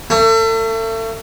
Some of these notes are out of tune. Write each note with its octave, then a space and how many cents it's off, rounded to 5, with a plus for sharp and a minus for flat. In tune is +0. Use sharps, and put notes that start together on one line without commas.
A3 +35